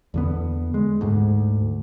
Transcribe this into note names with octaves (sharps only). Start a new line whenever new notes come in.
E2 D3 B3
G#3
D2 G#2